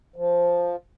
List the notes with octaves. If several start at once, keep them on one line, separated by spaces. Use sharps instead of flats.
F3